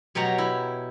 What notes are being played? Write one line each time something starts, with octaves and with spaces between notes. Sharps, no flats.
B2 F#3 G4 C#5 A#5
E4